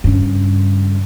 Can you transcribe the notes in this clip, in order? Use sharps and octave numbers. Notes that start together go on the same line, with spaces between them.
G2 C#3